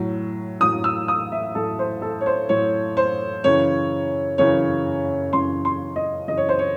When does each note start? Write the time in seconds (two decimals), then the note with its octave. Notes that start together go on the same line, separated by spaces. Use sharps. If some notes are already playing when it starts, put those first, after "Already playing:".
Already playing: A2 F#3
0.60 A2 F#3 D#6
0.84 E6
1.08 D#6
1.32 E5
1.55 A2 F#3 A4
1.79 C5
2.02 A4
2.21 C#5
2.26 C5
2.49 A2 F#3 C#5
2.97 C5
3.44 F#2 C#3 E3 C#5
4.38 F#2 C#3 E3 C#5
5.33 F#2 C#3 E3 C6
5.65 C6
5.96 D#5
6.28 F#2 C#3 E3 D#5
6.37 C#5
6.49 C5
6.59 C#5